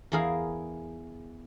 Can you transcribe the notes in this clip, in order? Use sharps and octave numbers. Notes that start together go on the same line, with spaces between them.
E2 E4 G#4 A#4 F5